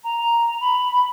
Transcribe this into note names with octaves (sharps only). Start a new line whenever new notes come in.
A#5
B5